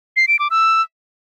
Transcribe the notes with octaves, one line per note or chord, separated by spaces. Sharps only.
C7
D7
D6
E6